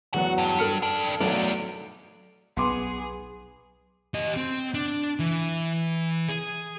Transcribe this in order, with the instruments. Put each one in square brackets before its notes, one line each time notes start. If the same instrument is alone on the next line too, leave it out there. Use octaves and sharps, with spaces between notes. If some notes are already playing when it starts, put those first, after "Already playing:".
[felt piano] E2 F#3 F#5 [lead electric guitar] F#4
[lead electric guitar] G2
[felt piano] A4 F6 C#7
[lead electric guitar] F2 D4
[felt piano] B1 F#3 A3 [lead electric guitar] E2 D5
[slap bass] B1 [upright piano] B3 [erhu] G#4 [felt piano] C6 D6
[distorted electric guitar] G4 D#5
C4
D4
E3
G#4